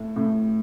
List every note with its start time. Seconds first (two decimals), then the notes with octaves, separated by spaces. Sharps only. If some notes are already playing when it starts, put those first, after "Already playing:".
Already playing: A2
0.16 A2